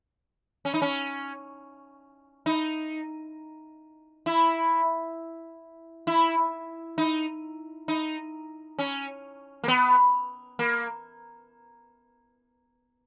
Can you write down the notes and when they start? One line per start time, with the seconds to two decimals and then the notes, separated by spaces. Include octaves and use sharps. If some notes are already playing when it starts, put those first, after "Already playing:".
0.65 C#4
0.74 D#4
0.82 C#4
2.46 D#4
4.26 E4
6.07 E4
6.98 D#4
7.88 D#4
8.79 C#4
9.64 A#3
9.68 B3
10.59 A#3